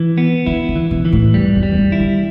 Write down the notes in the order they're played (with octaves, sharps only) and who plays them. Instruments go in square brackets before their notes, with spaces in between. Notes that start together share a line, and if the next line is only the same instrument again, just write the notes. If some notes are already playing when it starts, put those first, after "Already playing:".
Already playing: [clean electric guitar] E3
B3
[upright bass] D3 [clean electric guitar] E4
[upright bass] D3
[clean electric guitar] E3
[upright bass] B2
[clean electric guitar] E3
[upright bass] A2
[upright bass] E2 [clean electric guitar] G3
[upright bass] E2
[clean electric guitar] G3
[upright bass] E2
G2
[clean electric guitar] E4
[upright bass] D3